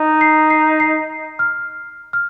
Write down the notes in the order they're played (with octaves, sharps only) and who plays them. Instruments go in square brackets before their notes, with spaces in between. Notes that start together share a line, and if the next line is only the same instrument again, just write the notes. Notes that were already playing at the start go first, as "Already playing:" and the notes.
Already playing: [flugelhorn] D#4
[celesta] C7
C7
C7
F6
F6